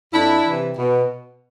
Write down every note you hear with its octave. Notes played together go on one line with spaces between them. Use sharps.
F2 D4 E4
C3 E3
B2